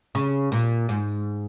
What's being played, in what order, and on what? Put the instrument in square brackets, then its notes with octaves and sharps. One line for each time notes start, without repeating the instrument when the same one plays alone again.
[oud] C#3
A#2
G#2